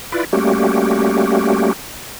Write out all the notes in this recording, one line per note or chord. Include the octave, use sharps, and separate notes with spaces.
E4 F4 B4 D5
G3 A3 A#3 C#4 F#4 G4